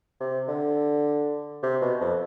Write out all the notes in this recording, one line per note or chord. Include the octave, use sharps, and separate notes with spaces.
C3
D3
C3
B2
F2